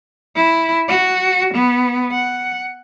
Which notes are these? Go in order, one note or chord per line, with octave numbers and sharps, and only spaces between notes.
E4
F#4
B3
F#5